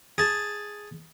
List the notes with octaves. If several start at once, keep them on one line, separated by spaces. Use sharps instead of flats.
G#4 A5